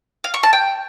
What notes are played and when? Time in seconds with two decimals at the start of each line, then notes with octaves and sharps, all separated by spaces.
0.24 F5
0.34 C#6
0.43 A5
0.53 G5